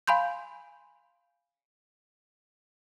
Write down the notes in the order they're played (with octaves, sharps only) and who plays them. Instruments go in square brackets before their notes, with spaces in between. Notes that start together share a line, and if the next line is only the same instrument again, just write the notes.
[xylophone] F5 G#5 B5 C6 G6